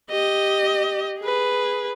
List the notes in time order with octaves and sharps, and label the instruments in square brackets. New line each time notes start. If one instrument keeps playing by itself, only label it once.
[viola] G4 D#5
G#4 B4